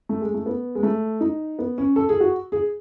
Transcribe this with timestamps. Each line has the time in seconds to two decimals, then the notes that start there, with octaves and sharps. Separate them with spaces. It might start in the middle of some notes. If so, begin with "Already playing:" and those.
0.09 A3
0.21 G#3
0.34 A3
0.46 B3
0.75 G#3
0.83 A3
1.21 D#4
1.59 B3
1.78 C#4
1.96 A4
2.09 G#4
2.20 F#4
2.52 G#4